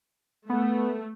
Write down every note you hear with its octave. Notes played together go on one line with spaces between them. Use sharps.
A3 B3